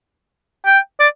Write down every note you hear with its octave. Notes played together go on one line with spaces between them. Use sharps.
G5
D5